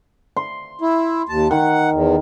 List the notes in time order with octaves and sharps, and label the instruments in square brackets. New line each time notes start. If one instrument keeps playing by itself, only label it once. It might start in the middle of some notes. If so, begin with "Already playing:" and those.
[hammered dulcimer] C6
[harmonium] E4
D#2 A5
[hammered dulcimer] D#3 [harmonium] F#5
[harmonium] E2